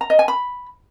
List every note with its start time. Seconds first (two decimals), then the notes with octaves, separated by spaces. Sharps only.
0.01 A#5
0.10 D#5
0.19 G#5
0.28 B5